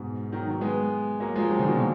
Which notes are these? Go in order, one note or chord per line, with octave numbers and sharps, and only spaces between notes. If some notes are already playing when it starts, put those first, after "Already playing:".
Already playing: G#2 B2
D#3 F#3
D#3 F#3
G#3 B3
F#3 A#3
F3 G#3
D#3 F#3
D3 F3
B2 D#3
A#2 D3